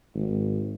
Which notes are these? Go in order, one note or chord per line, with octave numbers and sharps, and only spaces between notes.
G#1